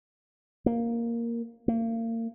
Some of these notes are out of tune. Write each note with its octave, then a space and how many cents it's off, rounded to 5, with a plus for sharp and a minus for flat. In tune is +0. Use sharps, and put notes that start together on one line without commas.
A#3 +0
A#3 -35